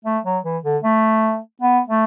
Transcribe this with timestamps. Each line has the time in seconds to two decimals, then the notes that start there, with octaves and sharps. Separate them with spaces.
0.05 A3
0.25 F#3
0.44 E3
0.64 D3
0.83 A3
1.62 B3
1.88 A3